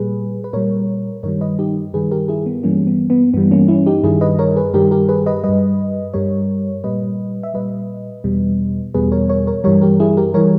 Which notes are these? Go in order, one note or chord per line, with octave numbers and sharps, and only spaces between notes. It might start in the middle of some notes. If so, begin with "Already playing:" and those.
Already playing: A#2 G3 G#4 B4
B4
A#2 G3 A#4 C#5
G2 D#3 G3 A#4 C#5
B4 D#5
D#4 G4
G2 D#3 G3 G#4 B4
G4 A#4
E4 G#4
B3
G2 E3 G3 A#3 C#4
B3
B3
G2 E3 G3 B3
A#3 C#4
C#4 E4
D#4 G4
G2 D#3 G3 E4 G#4
B4 D#5
A#4 C#5
G#4 B4
G2 D#3 G3 G4 A#4
G4 A#4
G#4 B4
B4 D#5
G2 G3 B4 D#5
G2 G3 A#4 C#5
A#2 G3 B4 D#5
E5
A#2 G3 B4 D#5
E2 B2 G3
E2 B2 G3 G#4 B4
A#4 C#5
A#4 C#5
A#4 C#5
G2 E3 G3 A#4 C#5
G4 A#4
E4 G#4
G4 A#4
E3 G3 A#4 C#5